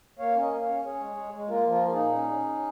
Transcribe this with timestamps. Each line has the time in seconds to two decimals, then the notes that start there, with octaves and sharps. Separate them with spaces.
0.19 A#3 C#5 F5
0.35 C#4
0.41 A#4 D#5
0.52 A#3
0.62 C#4 C#5 F5
0.85 C#4 G#4 C#5
1.00 G#3
1.17 G#3
1.33 G#3
1.49 A#3 F4 A#4
1.65 F3
1.71 F4 A#4
1.81 A#3
1.88 F4
1.92 D#4 G#4
1.98 A#2
2.14 C#4
2.30 C#4
2.47 C#4